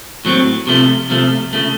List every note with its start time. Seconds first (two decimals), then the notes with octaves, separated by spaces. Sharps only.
0.25 A2 F#3 C4
0.67 C3 F3 A3
1.10 C3 F3 A3
1.53 C#3 A3